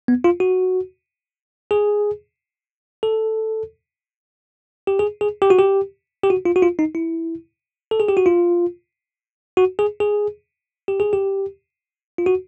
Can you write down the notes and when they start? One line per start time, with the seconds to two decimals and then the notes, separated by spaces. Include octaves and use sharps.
0.08 B3
0.24 F4
0.40 F#4
1.71 G#4
3.03 A4
4.87 G4
4.99 G#4
5.21 G#4
5.42 G4
5.50 F#4
5.59 G4
6.23 G4
6.30 F#4
6.45 F4
6.56 F#4
6.62 F4
6.79 D#4
6.95 E4
7.91 A4
8.00 G#4
8.09 G4
8.17 F#4
8.26 F4
9.57 F#4
9.79 G#4
10.00 G#4
10.88 G4
11.00 G#4
11.13 G4
12.18 F4
12.26 F#4